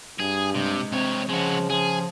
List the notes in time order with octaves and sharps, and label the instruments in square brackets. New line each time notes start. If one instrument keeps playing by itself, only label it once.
[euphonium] G2 [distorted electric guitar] G#4
[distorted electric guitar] C3 [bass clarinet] G#3
[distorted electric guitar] C3 C#5 [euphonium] C4
[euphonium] C#3 [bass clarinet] F3 [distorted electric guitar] G#3 F#4
[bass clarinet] F3 [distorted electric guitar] G#4